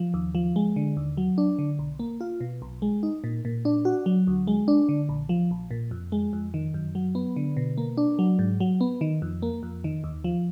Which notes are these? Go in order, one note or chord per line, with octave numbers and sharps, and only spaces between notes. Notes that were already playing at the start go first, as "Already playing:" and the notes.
Already playing: F3
D#2
F3
G#3
D3
D#2
F#3
D4
D3
B1
A#3
F4
B2
B1
G#3
D#4
A#2
A#2
D4
F#4
F#3
D2
G#3
D4
D3
A#1
F3
A#1
A#2
F2
G#3
F2
D#3
F#2
F#3
B3
D3
B2
A#3
D4
F#3
G#2
F#3
B3
D#3
F2
A#3
F2
D#3
D#2
F3